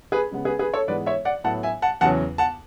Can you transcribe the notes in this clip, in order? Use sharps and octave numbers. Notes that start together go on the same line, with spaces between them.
G#4 B4
C#3 G#3 B3
G#4 B4
G#4 B4
A4 C#5
G#2 E3 G#3 B3 B4 D5
C#5 E5
D5 F#5
A2 F#3 B3 F#5 A5
E5 G#5
F#5 A5
E2 C#3 F#3 F#5 A5
F#5 A5